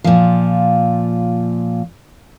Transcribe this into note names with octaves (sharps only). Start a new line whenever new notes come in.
A#2 F3